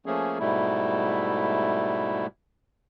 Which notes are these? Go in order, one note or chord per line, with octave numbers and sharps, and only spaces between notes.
F3 A3 A#3 C#4 G#4
G#2 B2 G3 A3 E4